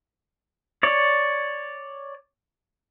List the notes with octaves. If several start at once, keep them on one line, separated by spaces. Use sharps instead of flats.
C#5 D5